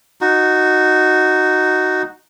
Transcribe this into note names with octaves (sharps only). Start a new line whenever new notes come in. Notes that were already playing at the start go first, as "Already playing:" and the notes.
D#4 F#4